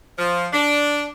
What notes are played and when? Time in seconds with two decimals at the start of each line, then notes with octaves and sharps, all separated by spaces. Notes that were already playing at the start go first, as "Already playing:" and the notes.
0.18 F3
0.53 D4